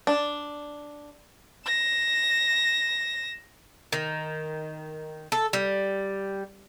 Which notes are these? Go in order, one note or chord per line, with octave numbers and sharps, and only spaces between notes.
D4
A#6 E7
D#3
A4
G3